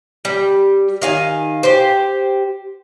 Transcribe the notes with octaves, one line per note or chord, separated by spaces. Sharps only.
G3
D#3 F5 G#5
G4 C5